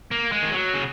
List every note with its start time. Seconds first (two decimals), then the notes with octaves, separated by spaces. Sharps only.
0.11 A#3
0.32 G#3
0.43 D#3
0.52 F#3
0.74 C#3